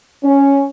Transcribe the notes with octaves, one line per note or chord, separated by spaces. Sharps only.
C#4